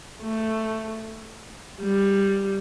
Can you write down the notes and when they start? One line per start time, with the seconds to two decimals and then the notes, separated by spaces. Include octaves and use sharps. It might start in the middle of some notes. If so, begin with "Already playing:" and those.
0.22 A3
1.81 G3